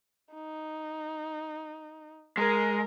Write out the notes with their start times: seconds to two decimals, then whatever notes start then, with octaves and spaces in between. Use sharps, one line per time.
0.33 D#4
2.37 G#3 A#4